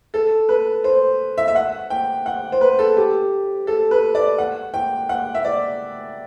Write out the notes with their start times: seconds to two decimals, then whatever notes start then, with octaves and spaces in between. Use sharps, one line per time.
0.14 A4
0.49 B4
0.84 C5
1.38 E5
1.48 E5
1.55 F#5
1.90 G5
2.26 F#5
2.52 C5
2.61 B4
2.79 A4
2.97 G4
3.67 A4
3.91 B4
4.15 D5
4.38 F#5
4.74 G5
5.09 F#5
5.35 E5
5.45 D5